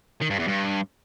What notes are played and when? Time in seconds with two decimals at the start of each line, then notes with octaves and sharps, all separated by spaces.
0.22 D#3
0.30 G2
0.39 E2
0.48 G2